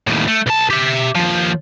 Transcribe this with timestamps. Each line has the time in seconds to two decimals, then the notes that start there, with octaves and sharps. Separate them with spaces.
0.07 D#2 A2
0.28 A3
0.47 B1 A5
0.71 G4 E5
1.15 D#2 F3